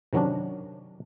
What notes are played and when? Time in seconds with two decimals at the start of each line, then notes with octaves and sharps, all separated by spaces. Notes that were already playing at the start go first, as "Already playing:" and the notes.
0.13 C3 D#3 F#3 C#4 D4